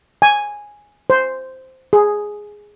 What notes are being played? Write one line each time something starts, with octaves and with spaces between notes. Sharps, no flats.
G#5
C5
G#4